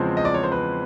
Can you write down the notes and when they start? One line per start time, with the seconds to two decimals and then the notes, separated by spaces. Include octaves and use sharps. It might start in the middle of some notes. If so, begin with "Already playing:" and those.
Already playing: E2 C#3 F3 G#3 C4
0.17 D#5
0.25 D5
0.34 C#5
0.43 C5
0.52 B4